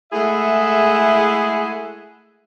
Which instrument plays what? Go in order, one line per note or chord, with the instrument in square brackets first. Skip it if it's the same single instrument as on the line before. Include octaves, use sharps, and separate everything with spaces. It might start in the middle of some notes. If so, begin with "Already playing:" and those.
[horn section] G#3 A3 E4 G#4 E5 F#5